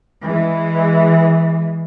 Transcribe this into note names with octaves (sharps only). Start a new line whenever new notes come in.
E3 G#3